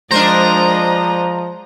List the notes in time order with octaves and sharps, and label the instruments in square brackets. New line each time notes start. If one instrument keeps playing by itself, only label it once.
[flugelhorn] F3 [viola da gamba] G#3 D#5 [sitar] D4 A#4 C5 [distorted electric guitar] A#5